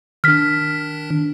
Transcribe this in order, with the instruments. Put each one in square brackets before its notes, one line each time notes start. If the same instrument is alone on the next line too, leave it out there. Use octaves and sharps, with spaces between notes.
[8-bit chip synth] D#3 D4 [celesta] F6 B6